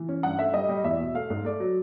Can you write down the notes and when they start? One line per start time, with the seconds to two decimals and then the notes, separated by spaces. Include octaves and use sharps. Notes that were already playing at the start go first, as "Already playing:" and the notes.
Already playing: E3
0.09 C#4
0.23 G2 F#5
0.39 A3 E5
0.54 G3 D#5
0.69 G3
0.84 E2 E5
0.99 B2
1.14 A3 F5
1.30 G#2
1.45 A3 D5
1.60 F#3